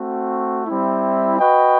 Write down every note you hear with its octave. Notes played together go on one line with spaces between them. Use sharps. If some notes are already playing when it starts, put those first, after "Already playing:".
Already playing: A3 C4 F#4
G3 C4 E4
F#4 B4 D#5 G5